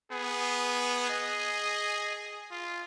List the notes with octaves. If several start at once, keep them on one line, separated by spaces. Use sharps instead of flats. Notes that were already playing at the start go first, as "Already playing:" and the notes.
B3 G#4
D#5
F4